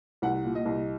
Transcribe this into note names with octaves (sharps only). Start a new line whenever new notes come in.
C2 F#5
A#2
D#5
C2